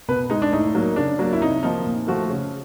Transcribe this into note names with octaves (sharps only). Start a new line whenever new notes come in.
B2 B4
G#3 D#4
D4
A2 D#4
F#3 A#3
C#3 D4
F#3 A#3
E4
C3 D#4
F3 A#3 D#4
A#2
F3 A3 F#4
C#3